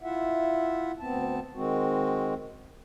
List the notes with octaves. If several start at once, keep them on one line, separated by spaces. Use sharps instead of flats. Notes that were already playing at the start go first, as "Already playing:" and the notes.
E4 F4 E5 F#5
D2 B3 C4 A5
D#3 G#3 C4 F#4